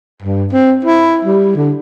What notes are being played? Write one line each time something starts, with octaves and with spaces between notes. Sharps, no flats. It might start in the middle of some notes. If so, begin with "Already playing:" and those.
G2
C4
E4
G3
D3